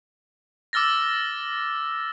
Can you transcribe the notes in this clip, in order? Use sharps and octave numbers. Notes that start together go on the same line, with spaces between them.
D6 E6 F6 A6 A#6